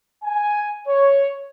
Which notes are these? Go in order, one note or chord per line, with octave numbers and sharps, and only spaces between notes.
G#5
C#5